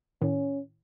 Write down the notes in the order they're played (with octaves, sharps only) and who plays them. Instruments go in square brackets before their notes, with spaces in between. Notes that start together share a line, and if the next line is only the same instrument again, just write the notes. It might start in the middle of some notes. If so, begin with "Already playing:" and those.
[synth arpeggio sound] A2 D#3 [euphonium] C#4